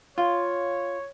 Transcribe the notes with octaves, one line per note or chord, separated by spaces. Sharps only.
F4 C#5